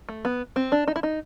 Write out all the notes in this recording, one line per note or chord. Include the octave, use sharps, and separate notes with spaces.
A3
B3
C4
D4
D#4
E4
D#4